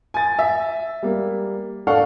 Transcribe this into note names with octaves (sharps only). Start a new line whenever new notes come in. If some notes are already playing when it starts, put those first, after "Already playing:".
G#5 A6
E5
G3 A#3
D4 A4 F5 F#5 C#6